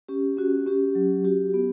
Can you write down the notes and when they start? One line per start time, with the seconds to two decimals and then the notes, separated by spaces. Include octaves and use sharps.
0.08 C#4 G4
0.37 C#4 F#4
0.66 C#4 G4
0.95 F#3
1.24 F#4 G4
1.54 B3